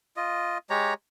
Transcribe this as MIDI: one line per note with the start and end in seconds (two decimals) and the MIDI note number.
0.17 0.58 65
0.17 0.58 75
0.70 0.94 56
0.70 0.94 67
0.70 0.94 73
0.70 0.94 82